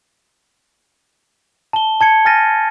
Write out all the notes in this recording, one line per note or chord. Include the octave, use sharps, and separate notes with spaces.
A5 G7
A5 G#6 C#7
G#5 F6 A6 A#6 D#7